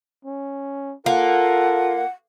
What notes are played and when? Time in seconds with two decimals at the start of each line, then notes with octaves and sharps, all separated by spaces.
0.25 C#4
1.06 A#3 F4 A4 F#5